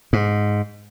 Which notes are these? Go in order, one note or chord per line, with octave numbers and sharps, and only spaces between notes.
G#2